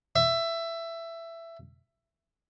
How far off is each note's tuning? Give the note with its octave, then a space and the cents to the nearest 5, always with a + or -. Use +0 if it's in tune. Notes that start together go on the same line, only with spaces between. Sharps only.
E5 +15